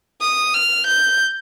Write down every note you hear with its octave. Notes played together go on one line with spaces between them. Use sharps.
D#6
F6
G6